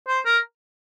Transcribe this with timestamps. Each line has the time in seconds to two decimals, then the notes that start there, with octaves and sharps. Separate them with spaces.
0.07 C5
0.25 A#4